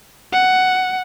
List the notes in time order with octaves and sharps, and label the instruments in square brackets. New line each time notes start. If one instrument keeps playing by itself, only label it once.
[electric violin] F#5